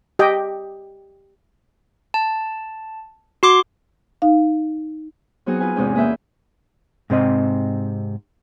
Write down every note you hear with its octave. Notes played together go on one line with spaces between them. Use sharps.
G4 D#5 G5
A5
F#4 C6 D6
D#4 F5
F#3 B3 C4 D#4 F#4 G#4
F4 B4 G#5
E2 G#2 C3 G#3 C4 C#4
A#3 G#4 B4 E5 G5
G#2 C3 C4 D#5